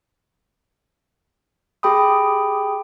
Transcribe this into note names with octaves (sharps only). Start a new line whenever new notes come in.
G4 G#4 G5 B5 D#6